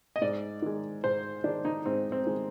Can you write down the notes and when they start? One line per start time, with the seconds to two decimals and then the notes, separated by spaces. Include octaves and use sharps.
0.16 D#5
0.21 G#2 D5
0.62 D#3 G#3
1.04 G#2 C5
1.44 D#3 G#3 D4
1.65 D#4
1.85 G#2 C4
2.12 C4
2.27 D#3 G#3